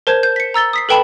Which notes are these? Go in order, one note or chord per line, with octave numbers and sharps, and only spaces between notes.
A#4 C5 A5 G6 G#6
G6
B6 C#7
A#5 E6 A6 G7
D#6 B6 C7
A4 B4 G5 A5 B5